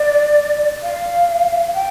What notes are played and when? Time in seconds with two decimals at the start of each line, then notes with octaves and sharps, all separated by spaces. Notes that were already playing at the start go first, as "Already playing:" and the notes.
Already playing: D5
0.83 F5
1.74 G5